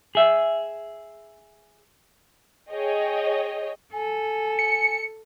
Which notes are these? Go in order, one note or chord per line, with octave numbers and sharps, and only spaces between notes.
G#4 E5
G#4 C#5 D#5 G5
A4 G#5
C#7